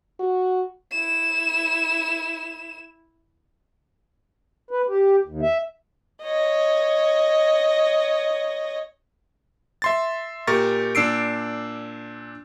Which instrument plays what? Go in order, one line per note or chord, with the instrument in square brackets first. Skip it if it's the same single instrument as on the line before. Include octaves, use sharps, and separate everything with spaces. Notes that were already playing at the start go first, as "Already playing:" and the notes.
[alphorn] F#4
[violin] E4 E7
[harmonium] B4
G4
D#2
E5
[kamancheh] C#5 D#5
[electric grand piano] E5 C6 A6
A#2 G4 A#4 C#6 A6
A#2 D4 E6 C7 D7